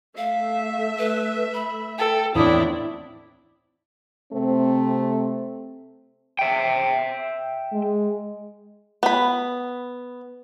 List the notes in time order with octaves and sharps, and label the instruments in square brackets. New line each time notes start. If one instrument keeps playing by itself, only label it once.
[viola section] A3 E5 [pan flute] F5
[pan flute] B4
B5
[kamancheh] A4 [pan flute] G5
[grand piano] E2 A2 E3 [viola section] C4 [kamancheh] D4 E4 [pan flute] D#6
[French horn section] C3 A3 C4
[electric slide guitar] E5 G5
[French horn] G#3
[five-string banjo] B3 B5